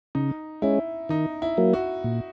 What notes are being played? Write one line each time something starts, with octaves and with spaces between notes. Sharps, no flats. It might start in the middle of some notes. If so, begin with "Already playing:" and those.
C#3 D#4
G#3 C#4 E4
D#3 D#4
E4
F#3 A#3
F#4
A#2